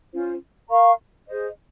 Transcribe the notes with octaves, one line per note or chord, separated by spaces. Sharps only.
C#4 F4 C5
A#4 F5 A#5 C#6
G#4 C5 D#5